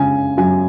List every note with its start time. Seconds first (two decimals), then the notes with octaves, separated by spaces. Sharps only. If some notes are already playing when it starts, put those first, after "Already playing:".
Already playing: C#3 G#3 G#5
0.37 F#2 G#5